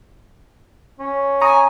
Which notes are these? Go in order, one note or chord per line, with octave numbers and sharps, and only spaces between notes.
C#4
G#5 A#5 C#6 D#6